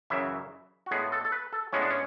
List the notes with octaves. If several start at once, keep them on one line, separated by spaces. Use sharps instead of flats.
F#2 C#3 E3 E5
F#4
A2 G#3 B3 G#4
A4
A4
B4
A4
A2 G#3 B3 C#4
D4
C#4